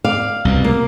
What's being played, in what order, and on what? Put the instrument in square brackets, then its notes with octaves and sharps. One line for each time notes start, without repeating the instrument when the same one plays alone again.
[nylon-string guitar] D5 F5
[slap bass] C2 B2
[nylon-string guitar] A#3